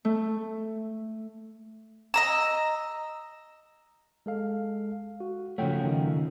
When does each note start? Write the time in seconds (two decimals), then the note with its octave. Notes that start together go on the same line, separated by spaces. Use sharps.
0.05 A3
2.14 D#5 A#5 E6
4.26 G#3 A4 F5
5.20 F#4
5.58 C#3 F3 A3 C#5 F#5 G5
5.85 D#3 D#4